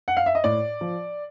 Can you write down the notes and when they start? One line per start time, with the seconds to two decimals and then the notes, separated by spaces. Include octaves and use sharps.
0.08 F#5
0.17 F5
0.26 E5
0.35 D#5
0.44 A2 D5
0.81 F3